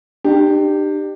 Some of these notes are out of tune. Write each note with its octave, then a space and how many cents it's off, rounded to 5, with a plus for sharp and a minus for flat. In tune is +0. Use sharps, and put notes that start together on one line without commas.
D4 +45 G4 +0